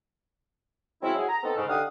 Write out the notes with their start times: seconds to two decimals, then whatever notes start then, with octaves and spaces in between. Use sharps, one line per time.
1.02 F#3 G#3 C4 C#4 E4
1.15 F#4 G#4
1.28 A#5
1.42 B3 C4 D#4 A4
1.56 G#2 C#3
1.68 D3 D#4 G4 F5 F#5 D#6